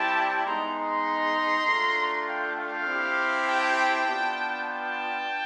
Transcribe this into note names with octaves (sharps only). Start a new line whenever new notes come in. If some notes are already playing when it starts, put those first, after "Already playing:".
Already playing: G3 C4 E4 G4 G5 A5
G#3 B3 D#4 A#5 C6
A#5 C6
A3 D4 F4
F5 G5
F5 G5
C4 E4 G4
G5 A5
B3 D4 F4
G5 A5